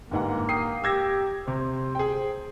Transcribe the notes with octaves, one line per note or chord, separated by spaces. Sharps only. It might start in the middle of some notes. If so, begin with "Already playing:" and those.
G1 G#2 A#3 F#5
G5 D#6 C7
G4 E6 G#6 A#6
C3 C5
G#4 G5